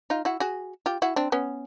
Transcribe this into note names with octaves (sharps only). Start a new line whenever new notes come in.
D#4 F4
E4 F#4
F#4 G#4
F4 G4
E4 F#4
C4 D4
B3 C#4